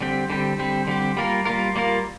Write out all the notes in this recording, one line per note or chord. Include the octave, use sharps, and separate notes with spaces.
D3 G3 C4 G4
D3 G3 C4 G4
D3 G3 C4 G4
D3 G3 C4 G4
G3 A#3 F4 A#4
G3 A#3 F4 A#4
G3 A#3 F4 A#4